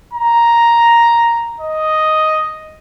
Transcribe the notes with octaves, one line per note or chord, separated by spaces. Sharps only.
A#5
D#5